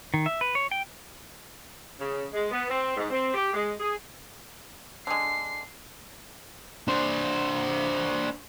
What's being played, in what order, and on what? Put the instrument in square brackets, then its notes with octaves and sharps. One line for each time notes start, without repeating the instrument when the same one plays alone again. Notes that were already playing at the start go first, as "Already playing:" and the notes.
[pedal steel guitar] D#3
E5
B4
C#5
G5
[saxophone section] C#3
G#3
B3
C4
G#2
C4
G4
G#3
G#4
[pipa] D3 G#3 [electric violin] C7
[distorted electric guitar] D4 C5